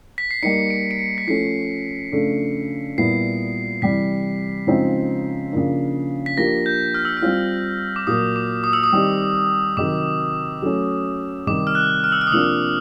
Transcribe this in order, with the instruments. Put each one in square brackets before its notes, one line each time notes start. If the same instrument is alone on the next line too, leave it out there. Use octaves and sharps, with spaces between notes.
[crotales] B6
C7
[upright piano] G3 A#3 D#4 [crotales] C#7
[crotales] D7
D7
C#7
B6
[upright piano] F3 A3 C#4 [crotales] C7
[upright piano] C#3 F3 A3 D4
[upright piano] A#2 G3 B3 E4 [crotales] C7
[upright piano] C3 E3 G3 [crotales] B6
[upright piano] C#3 F3 G#3 C4 D#4
C#3 F3 A#3 D4
[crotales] B6
[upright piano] F3 A#3 D4 G4 [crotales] A#6
[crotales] G6
F6
E6
F6
[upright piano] G3 C4 F4
[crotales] D6
[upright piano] A#2 F#3 A#3 [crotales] D#6
[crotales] D6
D#6
E6
D#6
[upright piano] D#3 G3 C4 D#4 G4
[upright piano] C3 D#3 F#3 [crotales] D6
[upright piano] F#3 A3 C#4
[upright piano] C3 D#3 G3 [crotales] D6
[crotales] F6
F#6
F6
E6
F6
D#6
[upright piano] C3 F3 A#3 D4 F4 [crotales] E6